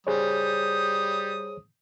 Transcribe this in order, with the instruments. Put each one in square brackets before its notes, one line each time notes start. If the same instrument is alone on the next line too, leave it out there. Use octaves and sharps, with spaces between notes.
[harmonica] G3 D#6 [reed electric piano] G#4 C5 C#5